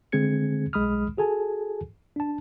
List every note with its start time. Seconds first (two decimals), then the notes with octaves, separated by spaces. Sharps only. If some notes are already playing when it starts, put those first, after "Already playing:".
0.12 D3 G#3 C4 G#4 G#6 C#7
0.73 B1 G#3 B5 D#6 F6
1.17 F#4 G#4 A4 G#5 A5
2.16 D4 A5